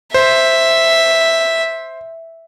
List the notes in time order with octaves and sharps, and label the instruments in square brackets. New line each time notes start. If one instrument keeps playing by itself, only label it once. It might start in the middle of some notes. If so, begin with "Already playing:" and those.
[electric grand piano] C5 [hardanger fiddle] E5